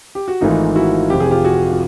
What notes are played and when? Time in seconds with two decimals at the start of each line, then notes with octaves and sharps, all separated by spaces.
0.15 G4
0.28 F#4
0.41 G#1 G#2 E3 A3 D#4 F4
0.76 E4 F#4
1.10 F1 F2 C3 G4
1.20 G#4
1.31 F4 G4
1.44 F#4 G#4
1.72 F4